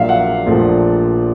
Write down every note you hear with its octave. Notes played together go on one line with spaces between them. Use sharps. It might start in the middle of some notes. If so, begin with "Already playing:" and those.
Already playing: A#1 A#2 F#3 E5 F5
F#5
A#1 A#2 F3 A3